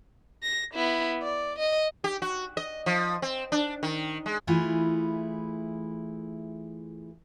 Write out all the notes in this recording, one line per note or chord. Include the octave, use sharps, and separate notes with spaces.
A#6
B3 E4
D5
D#5
G4
F#4
D#5
F3
C4
D4
D#3
G#3
E3 A3 E4 F4 G#4